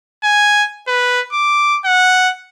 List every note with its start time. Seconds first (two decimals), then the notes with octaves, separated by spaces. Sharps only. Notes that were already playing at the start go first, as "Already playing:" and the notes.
0.24 G#5
0.88 B4
1.33 D6
1.85 F#5